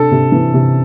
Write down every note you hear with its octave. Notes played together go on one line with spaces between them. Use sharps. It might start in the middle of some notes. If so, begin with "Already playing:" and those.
Already playing: C3 D4 A4
C3
E3
C3